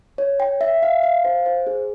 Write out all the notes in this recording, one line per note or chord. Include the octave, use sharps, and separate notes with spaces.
C#5
G5
E5
F5
F5
C5
C5
G#4